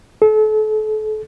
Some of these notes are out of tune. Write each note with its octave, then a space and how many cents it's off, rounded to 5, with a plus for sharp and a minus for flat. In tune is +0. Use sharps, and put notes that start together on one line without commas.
A4 -35